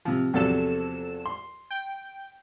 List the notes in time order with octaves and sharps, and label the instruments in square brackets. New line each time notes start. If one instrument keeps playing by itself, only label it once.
[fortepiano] C3 F3
[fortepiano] E2 C3 F#3 [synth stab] F3 A4 E7
[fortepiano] C6
[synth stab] G5